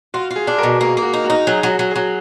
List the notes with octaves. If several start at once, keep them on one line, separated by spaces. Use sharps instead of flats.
F4 F#4
F4
G#4
D4
B2 F#4 A#4
A#3 G#4
A#3
F#4
D#4
F#4
D#4
F#3 G#4
F#3
F#4
F#3
F#3 G#4